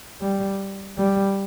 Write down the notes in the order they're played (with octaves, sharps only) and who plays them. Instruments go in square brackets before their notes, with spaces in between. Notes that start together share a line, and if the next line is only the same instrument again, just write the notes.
[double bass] G3
G3